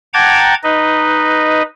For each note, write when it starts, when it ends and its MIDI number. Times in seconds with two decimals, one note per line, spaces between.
0.14 0.54 78
0.14 0.54 79
0.14 0.54 81
0.14 0.54 82
0.14 0.54 86
0.14 0.54 92
0.63 1.62 63
0.63 1.62 71
0.63 1.62 75